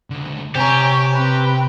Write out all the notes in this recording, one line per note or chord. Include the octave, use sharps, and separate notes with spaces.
C#2 D3
C3 G4 C5 C#5 G#5 A#5
C4 B4